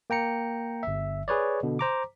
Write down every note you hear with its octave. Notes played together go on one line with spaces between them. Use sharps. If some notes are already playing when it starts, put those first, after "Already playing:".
A#3 G5 A#5 C#7
G1 E5
G#4 B4 C#5 D5
B2 D3
C5 A#5 D6